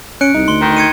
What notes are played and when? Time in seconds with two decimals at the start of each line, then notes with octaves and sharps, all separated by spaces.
0.21 C#4 F#6 C#7 D7
0.34 C2 D#4
0.48 D2 C6 G7
0.61 D#3
0.77 G#6 C#7 D#7